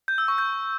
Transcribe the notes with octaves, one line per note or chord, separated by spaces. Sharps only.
G6
E6
C#6
G6